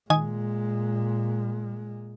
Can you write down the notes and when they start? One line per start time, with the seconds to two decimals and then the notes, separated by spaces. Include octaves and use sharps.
0.10 A#2 D#3 G#3 G#5 D#6